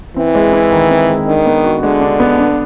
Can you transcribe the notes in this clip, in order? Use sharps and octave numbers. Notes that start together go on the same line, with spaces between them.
E3 C4
G#3
E4
D#3
C4
G#3
D#3 D4
B3
F#4
D3 G#3
D4
B3
D4